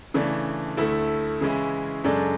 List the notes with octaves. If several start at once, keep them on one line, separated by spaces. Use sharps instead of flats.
C#3 E3 A3 D4
D2 D3 A3 E4 A4
C#3 E3 G#3 C#4 E4
F#2 C#3 G#3 D4 A4